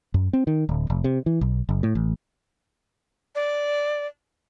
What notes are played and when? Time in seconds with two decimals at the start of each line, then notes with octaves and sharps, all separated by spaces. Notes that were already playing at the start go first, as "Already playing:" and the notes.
0.14 F#2
0.33 C4
0.47 D#3
0.69 D1
0.90 F1
1.04 C3
1.26 E3
1.41 B1
1.69 F#1
1.83 A2
1.95 A1
3.35 D5